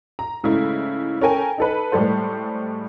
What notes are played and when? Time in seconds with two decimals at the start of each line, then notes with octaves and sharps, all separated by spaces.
0.19 A#5
0.44 G#2 C#3 G#3 A3 E4
1.21 C#4 A4 A#4 G5 G#5
1.58 D#4 A4 B4
1.92 A2 G3 G#3 A4 C5